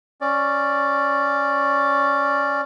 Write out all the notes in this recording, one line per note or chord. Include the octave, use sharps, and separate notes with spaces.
C#4 D5